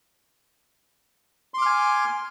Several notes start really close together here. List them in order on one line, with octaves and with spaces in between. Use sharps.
C6 D6 F6 G#5